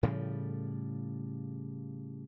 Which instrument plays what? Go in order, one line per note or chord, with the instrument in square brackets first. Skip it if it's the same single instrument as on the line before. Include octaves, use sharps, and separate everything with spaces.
[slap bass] A2 C#3 F3 G3